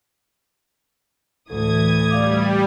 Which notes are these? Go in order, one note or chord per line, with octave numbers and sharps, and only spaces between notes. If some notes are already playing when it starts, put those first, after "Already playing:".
D2 A2 E3 A4 D#6 G#6
G3 D5 F5 D6